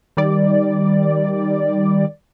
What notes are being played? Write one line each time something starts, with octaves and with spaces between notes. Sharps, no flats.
D#3 G3 D5